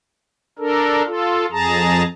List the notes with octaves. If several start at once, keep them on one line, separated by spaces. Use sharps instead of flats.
D4 A4 A#4
F4 A4
F2 G#4 A5 A#5